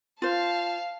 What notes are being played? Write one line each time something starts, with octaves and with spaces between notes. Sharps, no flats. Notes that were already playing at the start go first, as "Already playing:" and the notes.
F4 C5 F5 A5